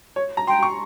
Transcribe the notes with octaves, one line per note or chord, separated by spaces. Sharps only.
C#5
A#5
G5 C6
C#6